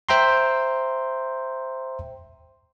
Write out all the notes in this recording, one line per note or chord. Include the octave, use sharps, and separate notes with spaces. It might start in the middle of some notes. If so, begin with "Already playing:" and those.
C5 E5 G5 A#5 C6